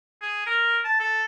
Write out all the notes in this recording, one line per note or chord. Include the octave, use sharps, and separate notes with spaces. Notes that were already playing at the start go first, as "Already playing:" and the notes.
G#4
A#4
A5
A4